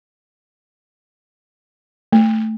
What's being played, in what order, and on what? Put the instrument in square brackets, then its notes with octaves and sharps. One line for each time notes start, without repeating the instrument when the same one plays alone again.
[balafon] A3